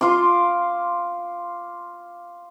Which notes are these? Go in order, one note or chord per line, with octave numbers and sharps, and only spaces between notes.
F4 C6 D6